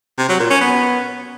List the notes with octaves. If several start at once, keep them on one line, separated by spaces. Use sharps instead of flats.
C3
F#3
A#2
C#4
B3